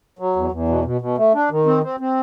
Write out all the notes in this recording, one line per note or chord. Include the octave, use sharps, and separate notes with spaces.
F#3
E2
E2
B2
B2
B2
A3
D4
D#3
C4
C4
C4